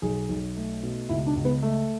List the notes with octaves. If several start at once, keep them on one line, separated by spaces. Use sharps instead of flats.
B1 G#4
B1
A3
B2
C#2 E4
D4
C#2
B3
A3